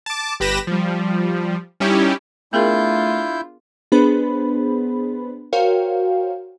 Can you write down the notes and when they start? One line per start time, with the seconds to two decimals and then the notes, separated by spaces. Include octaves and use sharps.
0.06 A5 D6
0.40 G1 G4 B4 B5 A#6 E7
0.67 F3 G3
1.80 G3 C#4 D#4 E4 G4
2.53 A3 B3 D4 E4 F4 G#4 A#4 G6
3.92 B3 D4 G#4 B4 C5 B5
5.53 F#4 A#4 C5 C#5 F5 G5